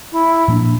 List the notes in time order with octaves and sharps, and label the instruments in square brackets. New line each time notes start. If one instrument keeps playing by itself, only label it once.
[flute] E4
[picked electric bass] A#2 F3 A#3 D4